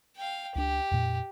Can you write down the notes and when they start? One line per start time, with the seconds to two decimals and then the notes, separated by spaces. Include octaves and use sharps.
0.16 F5 G5
0.55 C#2 D4 G4
0.91 F2 A#2